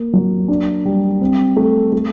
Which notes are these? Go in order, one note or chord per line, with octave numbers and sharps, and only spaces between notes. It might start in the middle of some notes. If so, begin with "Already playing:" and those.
Already playing: A#3
F#3
D4
G3
C4
A3
A3